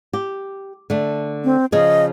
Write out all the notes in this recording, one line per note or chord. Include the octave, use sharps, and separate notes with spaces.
G4
D3 A3
C4
C#3 F3 G#4 D#5